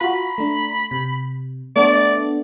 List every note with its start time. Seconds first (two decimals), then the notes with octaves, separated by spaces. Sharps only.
0.01 F4 F#4 B5
0.38 A3 D4
0.91 C3
1.76 A3 B3 D4 D5